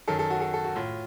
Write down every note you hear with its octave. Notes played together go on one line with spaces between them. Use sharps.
F#2 D#3 A4
A4
F#4
A4
A4
F#4
A2 F4